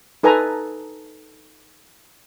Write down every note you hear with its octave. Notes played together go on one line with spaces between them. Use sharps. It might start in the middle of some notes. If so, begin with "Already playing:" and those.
D#4 A4 B4 G#5 A#5